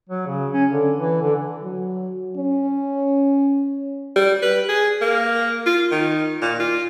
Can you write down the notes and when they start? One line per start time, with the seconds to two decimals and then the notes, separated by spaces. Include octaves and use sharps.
0.09 F#3
0.27 C#3
0.52 C#4
0.70 D3
0.98 E3
1.21 D3
1.62 F#3
2.37 C#4
4.16 G3
4.43 B4
4.69 G#4
5.01 A#3
5.66 F4
5.91 D#3
6.42 A#2
6.60 F4